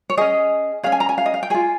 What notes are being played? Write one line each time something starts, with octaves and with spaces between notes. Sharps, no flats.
C#5
C#4 G#4 D#5
C#4 G#4 F5
G#5
A#5
G#5
F5
D#5
F5
G5
F4 G#4 G#5